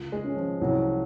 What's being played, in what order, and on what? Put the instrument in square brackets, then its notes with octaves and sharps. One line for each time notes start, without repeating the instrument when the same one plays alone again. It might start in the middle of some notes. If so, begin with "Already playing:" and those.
Already playing: [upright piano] C#2
[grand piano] G#3
[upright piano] C#4
[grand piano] F3
[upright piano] C2 [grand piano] F#3